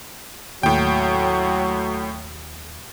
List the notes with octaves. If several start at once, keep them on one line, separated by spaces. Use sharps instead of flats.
D#2 A2 F#3 G5